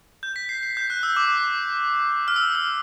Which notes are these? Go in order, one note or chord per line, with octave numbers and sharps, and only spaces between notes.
G6
B6
C7
C7
G6
F#6
E6
D6
F6
E6
F6